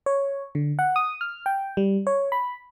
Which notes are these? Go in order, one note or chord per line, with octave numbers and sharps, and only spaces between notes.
C#5
D3
F#5
D#6
F6
G5
G3
C#5
B5